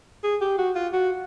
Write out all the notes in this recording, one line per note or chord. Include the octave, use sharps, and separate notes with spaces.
G#4
G4
F#4
F4
F#4